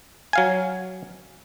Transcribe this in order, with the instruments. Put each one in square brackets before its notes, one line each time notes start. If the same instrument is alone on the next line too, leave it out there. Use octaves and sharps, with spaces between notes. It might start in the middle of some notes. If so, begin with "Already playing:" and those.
[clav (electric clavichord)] F#3 F5 G#5